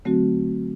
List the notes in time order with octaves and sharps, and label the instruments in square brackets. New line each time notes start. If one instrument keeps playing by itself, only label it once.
[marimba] D3 F#3 A3 C4 F#4